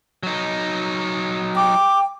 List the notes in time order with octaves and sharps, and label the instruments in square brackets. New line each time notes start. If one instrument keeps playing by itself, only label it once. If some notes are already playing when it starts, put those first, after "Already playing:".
[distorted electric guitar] F#3 D#4
[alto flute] G5 [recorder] D6